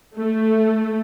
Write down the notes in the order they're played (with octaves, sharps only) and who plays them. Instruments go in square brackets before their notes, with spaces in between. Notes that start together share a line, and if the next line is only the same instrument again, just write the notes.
[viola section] A3